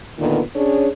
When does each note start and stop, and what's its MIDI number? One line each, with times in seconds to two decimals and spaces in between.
0.19 0.41 46
0.19 0.41 50
0.19 0.41 51
0.19 0.41 59
0.54 0.88 61
0.54 0.88 62
0.54 0.88 68
0.54 0.88 73